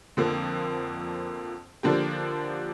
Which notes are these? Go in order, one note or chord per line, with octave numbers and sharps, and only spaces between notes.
F2 D3 F3 A#3
D3 F3 A#3 D4 G4